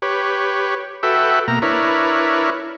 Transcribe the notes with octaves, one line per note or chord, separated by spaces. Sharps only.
G4 B4 C#5
F#4 A4 B4 E5 G5
B2 A#3 A#5
D4 E4 A#4 B4 C#5